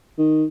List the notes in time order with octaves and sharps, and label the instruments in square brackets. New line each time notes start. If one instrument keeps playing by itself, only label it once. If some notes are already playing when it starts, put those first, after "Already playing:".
[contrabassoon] D#3